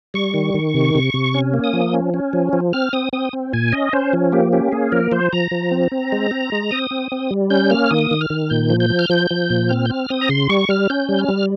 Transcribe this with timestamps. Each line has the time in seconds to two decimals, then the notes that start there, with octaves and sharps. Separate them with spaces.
0.14 G3 C#6
0.34 D#3
0.54 D#3
0.74 C3
0.95 C3
1.14 C3
1.34 C#4
1.54 A#3
1.64 D#6
1.73 F3
1.94 C#4
2.14 C#4
2.33 F3
2.53 F3
2.73 C4 F6
2.93 C4 D#6
3.13 C4 D#6
3.33 C4
3.53 A#2 G#5
3.72 C#4 D#5
3.93 C#4 C5
4.13 F3
4.32 A#3 G4
4.52 C#4 G4
4.72 A#3 G#4
4.92 F3 A#4
5.12 F3 C5
5.33 F3 A#5
5.51 F3
5.71 C4
5.92 C4
6.12 G#3
6.31 C4
6.52 G#3
6.71 C4 D#6
6.91 C4
7.12 C4
7.31 G3
7.50 C#4 G6
7.71 A#3 F6
7.91 D#3 D#6
8.11 D#3
8.21 F6
8.30 D#3
8.50 A#2 G6
8.70 F3
8.80 G6
8.90 F3
8.99 F6
9.10 F3 G6
9.31 F3
9.50 A#2
9.69 C4 F6
9.86 G6
9.90 C4 F6
10.09 C4 D#6
10.21 A#5
10.29 C#3 C6
10.49 G3 C#6
10.69 G3 F6
10.90 C#4 G6
11.09 G3
11.19 F6
11.28 G3